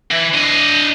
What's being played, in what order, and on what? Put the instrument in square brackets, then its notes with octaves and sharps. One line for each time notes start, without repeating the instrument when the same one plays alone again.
[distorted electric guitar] E3
D4 D#5